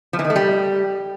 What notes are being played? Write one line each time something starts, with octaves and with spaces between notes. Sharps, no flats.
F3
E3
D#3
A3
G3